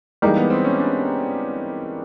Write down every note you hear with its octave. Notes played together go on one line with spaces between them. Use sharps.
E3 G3 G#3 A#3 D#4
B3
C4
C#4
D4